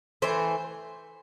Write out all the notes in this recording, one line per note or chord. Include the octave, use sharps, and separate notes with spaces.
E3 A3 C5